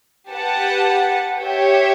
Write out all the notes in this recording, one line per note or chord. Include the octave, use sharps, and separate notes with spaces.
G4 B4 F#5 A5
G4 C#5 E5